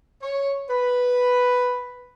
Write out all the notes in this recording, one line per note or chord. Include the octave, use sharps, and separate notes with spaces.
C#5
B4